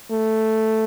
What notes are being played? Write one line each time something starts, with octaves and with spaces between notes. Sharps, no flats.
A3